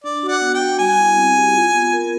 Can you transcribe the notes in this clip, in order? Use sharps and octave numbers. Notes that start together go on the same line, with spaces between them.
D4 D5
F#4
D5 F#5
B3
G5
F#4
G3 G#5
E4
C4
G4
F4
B3
A#4